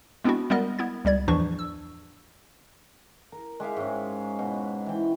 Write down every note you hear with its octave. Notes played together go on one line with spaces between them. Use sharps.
G#3 B3 C4 D4 E4 F#4
G3 G#3 B3 A#4 D#5
B3 E4 G#6
C#2 G3 D5 G#6
E2 A2 E3 F3 D4 C#6
E6
A#4
G#3 G4 E5 F5
G#2 C#4
B2
E3 G5